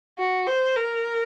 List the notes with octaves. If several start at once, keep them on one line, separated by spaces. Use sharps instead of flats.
F#4
C5
A#4